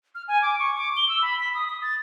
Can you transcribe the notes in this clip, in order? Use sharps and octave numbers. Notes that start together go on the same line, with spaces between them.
F6
G#5
D6
C#6
D6
G7
E6
B5
B6
D#6
D#6
A6